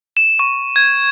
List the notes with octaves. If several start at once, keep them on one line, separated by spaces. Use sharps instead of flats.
E7
C#6
G#6